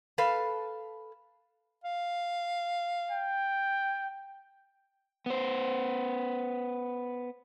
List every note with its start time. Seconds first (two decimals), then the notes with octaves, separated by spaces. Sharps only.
0.18 A4 B4 F5
1.84 F5
3.11 G5
5.26 B3 C5